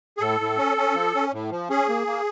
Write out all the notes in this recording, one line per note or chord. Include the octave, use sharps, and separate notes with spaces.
G#4
A2 A4
A2
C#4
C#4
F3
C#4
A2
F3
C#4 G#4
A#3
A#3